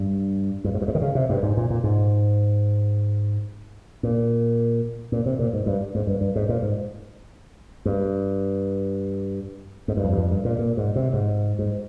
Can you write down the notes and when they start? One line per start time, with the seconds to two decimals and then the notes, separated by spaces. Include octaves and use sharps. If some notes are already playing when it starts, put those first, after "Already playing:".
Already playing: G2
0.64 G2
0.74 G#2
0.81 G2
0.88 G#2
0.95 D#3
1.01 C#3
1.15 C3
1.29 G2
1.43 G#2
1.57 A#2
1.70 A#2
1.84 G#2
4.03 A#2
5.12 A#2
5.26 C3
5.39 A#2
5.53 G#2
5.66 G2
5.95 G#2
6.07 G2
6.21 G2
6.36 G#2
6.49 A#2
6.62 G#2
7.85 G2
9.88 G#2
9.97 G2
10.04 F2
10.13 G2
10.17 F2
10.31 G2
10.45 A#2
10.59 A#2
10.77 G#2
10.96 C3
11.13 G#2
11.59 G#2